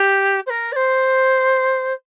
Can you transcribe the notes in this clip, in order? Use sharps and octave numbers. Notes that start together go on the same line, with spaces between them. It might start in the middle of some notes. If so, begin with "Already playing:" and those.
Already playing: G4
C5
A#4
D5
C5